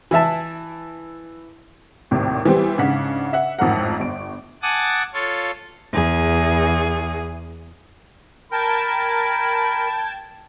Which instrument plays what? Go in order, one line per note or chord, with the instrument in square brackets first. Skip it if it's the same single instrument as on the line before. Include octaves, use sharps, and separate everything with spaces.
[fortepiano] E3 E4 E5 A5
[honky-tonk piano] G#1 D#2 A2 C3
E3 G3 B3 C4
G#2 C#3 D4 F#5 B6
E5 F#5
A1 F2 G#2 A#4 F#5
G1 D7
[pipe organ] F#5 G#5 A5 D6 D#6 F#6
F4 A4 C#5
[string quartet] E2 G#4
[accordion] A#4 [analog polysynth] G5 A5 G#6 [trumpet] B5